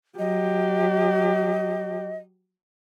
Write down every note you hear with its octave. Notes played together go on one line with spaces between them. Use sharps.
F#3 G4 D#5